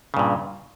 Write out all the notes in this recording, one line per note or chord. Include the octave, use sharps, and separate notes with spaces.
G2 A#2 C#3